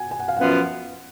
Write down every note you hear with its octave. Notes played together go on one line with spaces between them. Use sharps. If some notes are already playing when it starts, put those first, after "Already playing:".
Already playing: F#5 G#5
G#5
F#5
F5
F#2 F3 B3 F4 F#5